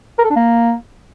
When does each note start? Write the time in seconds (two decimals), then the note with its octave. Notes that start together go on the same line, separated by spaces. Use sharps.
0.19 A#4
0.24 A4
0.30 D4
0.36 A#3